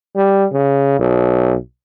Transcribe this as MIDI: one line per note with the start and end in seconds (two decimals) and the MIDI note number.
0.16 0.45 55
0.52 0.98 49
0.99 1.55 35